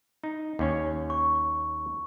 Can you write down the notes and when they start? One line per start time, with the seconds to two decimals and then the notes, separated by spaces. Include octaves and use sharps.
0.24 D#4
0.59 D#2 C#4 C#5
1.10 C#6